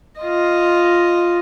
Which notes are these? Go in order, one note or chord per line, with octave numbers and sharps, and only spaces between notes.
F4 D#5